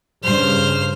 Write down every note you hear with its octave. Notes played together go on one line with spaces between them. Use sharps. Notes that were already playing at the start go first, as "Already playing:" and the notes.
G2 C#3 C5 F6